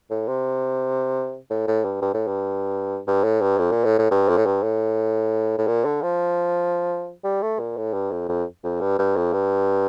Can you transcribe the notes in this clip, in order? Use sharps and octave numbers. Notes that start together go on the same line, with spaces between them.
A2
C3
A2
A2
G2
G2
A2
G2
G2
A2
G2
F2
A#2
A2
A2
G2
F2
A2
G2
A2
A2
A#2
D3
F3
G3
A3
A#2
A2
G2
F2
F2
F2
G2
G2
F2
G2